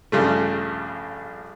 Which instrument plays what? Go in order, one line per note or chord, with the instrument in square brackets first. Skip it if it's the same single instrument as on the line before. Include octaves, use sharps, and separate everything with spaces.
[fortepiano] A#1 G2 C#3 A3